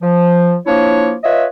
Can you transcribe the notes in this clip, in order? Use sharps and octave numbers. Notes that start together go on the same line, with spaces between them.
F3
F3 A#3 D4 E4 C#5
F4 B4 C#5 D#5 E5